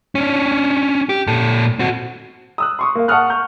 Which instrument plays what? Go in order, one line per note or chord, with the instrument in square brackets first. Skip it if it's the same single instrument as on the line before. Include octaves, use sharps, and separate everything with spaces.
[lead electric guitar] C#4 D4
G4
A#2 A4
C4 F#4
[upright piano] D#6 E6 F#6
C6 C#6 D#6
A#3 F5
F#5 A5 C#6 D#6 F6 F#6
C#6 F6 G6